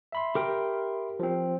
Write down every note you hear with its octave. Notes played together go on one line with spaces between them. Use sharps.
E5 B5 C6
G4 A#4 G5
F3 C4